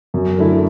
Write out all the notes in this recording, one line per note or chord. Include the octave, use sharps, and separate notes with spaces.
F#2
D3 A3 E4